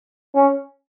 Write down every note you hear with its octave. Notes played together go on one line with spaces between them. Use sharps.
C#4